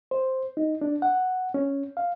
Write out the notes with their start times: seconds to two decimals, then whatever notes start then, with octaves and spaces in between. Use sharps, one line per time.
0.11 C5
0.57 D#4
0.81 D4
1.02 F#5
1.54 C#4
1.97 F5